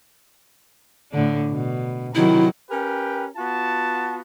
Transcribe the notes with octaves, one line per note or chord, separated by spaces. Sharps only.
A2 D3 D4
B2
C3 D#3 F#3 E4
C#4 G4 A#4 B4 G5
B3 F4 F#4 A5